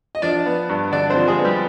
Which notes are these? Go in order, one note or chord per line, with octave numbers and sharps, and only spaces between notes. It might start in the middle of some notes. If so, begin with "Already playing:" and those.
D#5
F3 D4 D5
B3
G2
D3 D4 D5
C4 C5
F3
G#3 G#4
B3
G3 G4